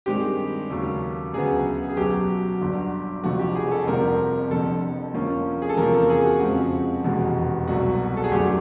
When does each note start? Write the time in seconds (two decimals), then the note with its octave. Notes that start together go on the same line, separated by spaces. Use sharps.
0.06 G2 D#3 G#3 C4 G4
0.70 D#2 C#3 F#3 A3 C#4
1.34 D2 C#3 F#3 B3 G#4
1.89 G#4
1.96 B1 B2 F#3 G4
2.60 G1 G2 D3 F#3
3.23 F1 F2 D3 F3 A3 F#4
3.39 G4
3.55 G#4
3.71 A4
3.87 G1 F2 C3 F3 A#4
4.50 F1 F2 D3 A4
5.14 F2 D3 F3 A#3 C#4
5.62 G#4
5.69 A4
5.77 E2 C3 F3 A#3 C#4 A#4
5.94 A4
6.10 G#4
6.25 F#4
6.40 F2 C#3 F3 G#3 C4 F#4
7.04 F1 E2 B2 G#3
7.67 C2 B2 F#3 A3 F#4
8.17 A4
8.24 G#4
8.31 G1 F#2 D#3 F#3 A3 G4